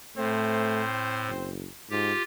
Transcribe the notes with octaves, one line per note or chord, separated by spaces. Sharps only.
A2 A3 C4 C5
F#1
G#2 F4 G4